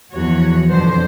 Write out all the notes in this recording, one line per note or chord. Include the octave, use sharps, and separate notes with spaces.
E2 F3 F#4 C#5
F2 B2 D3 F#3 C5